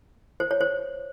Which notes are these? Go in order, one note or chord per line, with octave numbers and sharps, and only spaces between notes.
C5
C#5
C5